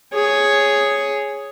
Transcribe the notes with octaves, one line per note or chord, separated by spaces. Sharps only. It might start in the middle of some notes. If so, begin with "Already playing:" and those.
G#4 C#5